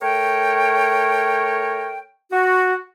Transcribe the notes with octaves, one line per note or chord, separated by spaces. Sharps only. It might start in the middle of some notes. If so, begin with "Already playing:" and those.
A3 A#4 C#5 G5
F#4